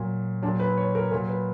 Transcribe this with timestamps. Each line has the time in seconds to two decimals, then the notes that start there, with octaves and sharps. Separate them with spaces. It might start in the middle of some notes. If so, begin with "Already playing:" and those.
Already playing: A#2 F#3
0.42 A#2 F#3 D4
0.60 B4
0.77 C#5
0.95 A#4
1.11 A#2 F#3 A#4
1.29 B4